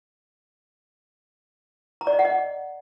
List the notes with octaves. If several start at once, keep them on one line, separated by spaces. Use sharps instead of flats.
A#5
D5
D#5
F#5
D#5